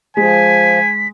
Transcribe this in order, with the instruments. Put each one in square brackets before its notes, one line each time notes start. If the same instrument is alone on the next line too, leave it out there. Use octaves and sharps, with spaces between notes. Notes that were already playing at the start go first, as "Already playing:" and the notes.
[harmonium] F3 [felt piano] G#3 [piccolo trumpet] G#5 [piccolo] B6